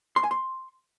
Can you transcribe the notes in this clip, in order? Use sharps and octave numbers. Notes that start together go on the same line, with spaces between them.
C6
G#5
C6